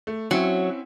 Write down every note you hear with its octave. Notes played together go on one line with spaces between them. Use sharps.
A3
F#3 C4 C#4 E4